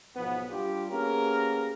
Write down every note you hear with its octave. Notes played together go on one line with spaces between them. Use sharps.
B1 G#2 F3 B3
G3 D4 F4 G4
A#3 B3 C#4 G4 G#4 A#4